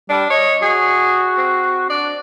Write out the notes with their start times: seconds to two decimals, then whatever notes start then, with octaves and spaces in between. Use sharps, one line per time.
0.10 G3 D4
0.30 C#5 D#5
0.62 F#4 G#4
1.37 C4
1.90 D4 D5